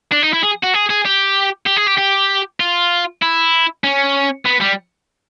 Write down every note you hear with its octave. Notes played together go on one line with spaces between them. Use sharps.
D4
D#4
E4
G#4
F#4
G#4
G#4
G4
G4
G#4
G4
G4
F4
E4
C#4
B3
G3